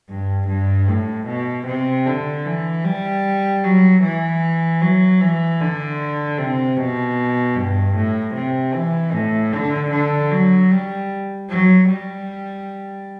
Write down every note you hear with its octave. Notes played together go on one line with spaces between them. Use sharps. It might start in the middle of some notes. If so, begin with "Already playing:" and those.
G2
G2
A2
B2
C3
D3
E3
G3
F#3
E3
F#3
E3
D3
C3
B2
G2
A2
C3
E3
A2
D3
D3
F#3
G3
F#3
G3